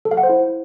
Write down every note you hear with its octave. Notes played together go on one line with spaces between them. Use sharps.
A4
F5
F#5
C5
E4